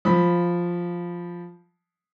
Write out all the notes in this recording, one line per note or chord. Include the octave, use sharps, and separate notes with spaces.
F3 B5